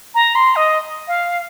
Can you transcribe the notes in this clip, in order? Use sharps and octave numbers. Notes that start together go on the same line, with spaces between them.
A#5
C6
D#5
F5